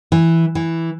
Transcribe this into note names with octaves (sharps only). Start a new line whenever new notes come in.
E3
E3